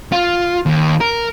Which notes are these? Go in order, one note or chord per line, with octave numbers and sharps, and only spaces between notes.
F4
D#2
A#4